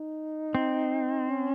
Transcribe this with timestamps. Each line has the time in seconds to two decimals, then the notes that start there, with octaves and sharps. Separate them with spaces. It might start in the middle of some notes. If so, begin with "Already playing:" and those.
Already playing: D#4
0.55 C4
1.30 C#4